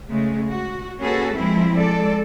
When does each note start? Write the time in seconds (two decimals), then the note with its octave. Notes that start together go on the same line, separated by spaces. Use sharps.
0.10 C#3 G#3 A3
0.49 F#4
1.01 A#3 C#4 F#4 G#4 A4 B4
1.35 F3 G#3 C4 E4
1.76 G#3 A4 D5